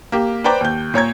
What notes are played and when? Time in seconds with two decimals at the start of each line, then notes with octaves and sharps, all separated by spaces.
0.12 A#3 G4
0.44 B4 C5 D5 G5 A#5 D6
0.61 D#2 G6
0.94 A#2 C#5 A#5 G#6